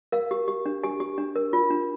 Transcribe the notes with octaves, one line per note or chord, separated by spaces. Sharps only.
A#4 F5
G4
G4
D4
G4 G#5
G4
D4
A#4
F4
D4